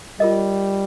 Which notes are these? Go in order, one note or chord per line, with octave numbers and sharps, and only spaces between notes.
G3 F4 A#4 D#5